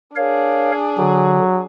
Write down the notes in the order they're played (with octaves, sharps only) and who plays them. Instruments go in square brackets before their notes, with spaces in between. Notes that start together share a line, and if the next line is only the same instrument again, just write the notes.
[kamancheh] D4 G#4 [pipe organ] A#4 C#5 F5
[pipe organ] D3 [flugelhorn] F#3